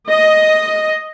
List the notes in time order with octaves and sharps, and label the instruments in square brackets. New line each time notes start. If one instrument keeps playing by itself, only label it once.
[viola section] D#5